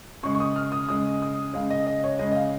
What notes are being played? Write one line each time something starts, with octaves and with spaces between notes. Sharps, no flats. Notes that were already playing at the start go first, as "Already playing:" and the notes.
C#3 G#3 C#6
C#6
D#6
F6
D#6
C#3 G#3 D#6
D#6
C#3 G#3 F5
D#5
D#5
C#5
C#3 G#3 D#5
D#5
F5